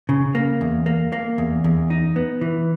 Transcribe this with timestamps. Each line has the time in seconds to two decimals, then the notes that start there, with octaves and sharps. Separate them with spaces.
0.09 C#3
0.35 A#3
0.61 E2
0.86 A#3
1.12 A#3
1.38 E2
1.64 E2
1.90 D#4
2.16 B3
2.41 E3